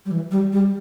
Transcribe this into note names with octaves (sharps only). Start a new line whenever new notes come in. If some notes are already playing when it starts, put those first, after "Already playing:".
G3
E3
G3
G3